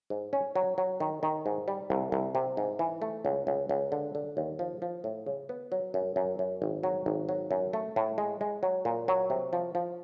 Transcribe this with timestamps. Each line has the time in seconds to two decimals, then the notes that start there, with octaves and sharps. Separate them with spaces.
0.10 G#2
0.33 C#4
0.56 F#3
0.78 F#3
1.00 D#3
1.23 D#3
1.46 G#2
1.68 G3
1.90 C2
2.12 C2
2.35 C3
2.57 G#2
2.79 E3
3.02 A3
3.25 C#2
3.47 C#2
3.69 C#2
3.92 D3
4.15 D3
4.37 D#2
4.59 F3
4.82 F3
5.04 A2
5.26 C#3
5.49 B3
5.72 F#3
5.94 F#2
6.16 F#2
6.39 F#2
6.62 G#1
6.83 F#3
7.06 G#1
7.29 F#3
7.51 F#2
7.73 A3
7.96 A2
8.18 G#3
8.41 G#3
8.63 F#3
8.85 A#2
9.08 F#3
9.30 C3
9.53 F3
9.75 F3